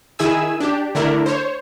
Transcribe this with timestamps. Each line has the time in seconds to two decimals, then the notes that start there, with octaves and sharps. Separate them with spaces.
0.19 D#3 E4 G#4 G#5 E6
0.60 D4 G4
0.95 D3 A3 D4 E4 A#4
1.26 C5 C#5